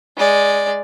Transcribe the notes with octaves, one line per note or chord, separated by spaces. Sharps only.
G#3 D5